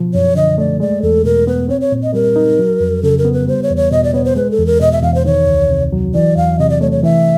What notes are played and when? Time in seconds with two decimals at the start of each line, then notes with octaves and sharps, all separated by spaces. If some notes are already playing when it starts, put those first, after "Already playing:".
Already playing: B2 F3
0.14 F#2 C#5
0.36 D3 D#5
0.58 A3 D5
0.80 G#3 D5
1.02 E2 A4
1.25 B2 A#4
1.47 B3 B4
1.69 C4 C#5
1.81 C#5
1.92 A#2
2.03 D#5
2.14 G3 A#4
2.36 D#4
2.59 F#3
2.80 F2
3.03 C#3 A4
3.18 A#4
3.25 B3
3.33 B4
3.47 G3 C5
3.63 C#5
3.70 E2
3.77 C#5
3.91 B2 D#5
4.04 D5
4.14 B3 C#5
4.25 C5
4.36 G#3 B4
4.51 A4
4.59 E2
4.66 A#4
4.80 B2 D#5
4.92 E5
5.03 E2 F5
5.15 C5
5.25 D#3 C#5
5.47 C#2
5.70 C3
5.93 F#3
6.14 E3 D5
6.37 E2 F5
6.59 C3 D#5
6.70 D5
6.81 A3 C#5
6.92 C#5
7.03 E3 E5